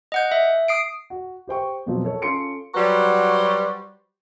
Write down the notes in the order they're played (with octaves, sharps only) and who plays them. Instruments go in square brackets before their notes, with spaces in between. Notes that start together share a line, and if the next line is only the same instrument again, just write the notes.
[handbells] D#5 F#5 G6
E5
D#6 C7 D7
[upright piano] F#4
G4 C5 G5 C#6
E2 B2 F3 F#3 C4
A4 A#4 C#5
C#4 F4 A4 C6 C#7 D7
[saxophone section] F#3 G3 F#4 B4 C5